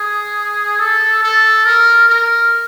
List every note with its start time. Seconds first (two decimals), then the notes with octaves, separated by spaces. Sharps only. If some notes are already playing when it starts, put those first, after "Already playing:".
Already playing: G#4
0.80 A4
1.23 A4
1.65 A#4
2.08 A#4